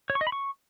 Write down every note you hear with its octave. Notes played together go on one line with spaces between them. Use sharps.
C#5
C#6
D#5
B5
C#6